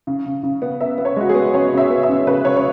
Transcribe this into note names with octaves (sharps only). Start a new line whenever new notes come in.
C#3
C#3
C#3
B3
B3 E5
B3
C#5
G#3 F#4
G#4
B3
C#3 C#5
C#3 E5
B3
E5
C#3
C#3 B4
C#3 C#5
C#5